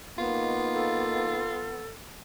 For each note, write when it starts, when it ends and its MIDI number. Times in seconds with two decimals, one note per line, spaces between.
0.18 1.43 58
0.18 1.82 59
0.18 1.43 63
0.18 1.72 65
0.74 1.88 69